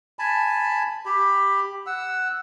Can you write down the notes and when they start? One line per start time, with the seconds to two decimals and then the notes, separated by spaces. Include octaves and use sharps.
0.19 G#5 A5 B5
1.06 G4 B5
1.86 F#5 E6